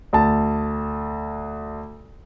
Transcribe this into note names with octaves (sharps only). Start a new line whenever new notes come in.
D2 A5